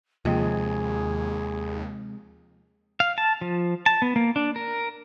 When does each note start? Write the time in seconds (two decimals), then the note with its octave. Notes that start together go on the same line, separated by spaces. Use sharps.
0.25 D#2 C3 F3 G#3 A#3 C4 F4 G#4
3.00 F5
3.18 A5
3.41 F3
3.86 A5
4.02 B3
4.16 A#3
4.36 D4
4.56 A#4